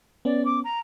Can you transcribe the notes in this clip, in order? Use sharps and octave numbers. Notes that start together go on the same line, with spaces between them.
B3 C#4 D5
D6
A#5